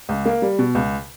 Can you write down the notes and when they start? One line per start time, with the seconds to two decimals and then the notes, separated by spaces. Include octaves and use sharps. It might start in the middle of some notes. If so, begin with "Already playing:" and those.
0.09 C#2
0.25 A#3
0.42 G3
0.59 B2
0.75 C#2